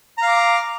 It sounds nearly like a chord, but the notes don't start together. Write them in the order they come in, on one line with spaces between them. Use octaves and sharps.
A#5 F5 D6